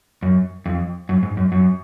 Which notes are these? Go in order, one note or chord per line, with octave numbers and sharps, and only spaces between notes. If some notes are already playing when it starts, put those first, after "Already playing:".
F#2
F2
F#2
G#2
F#2
F#2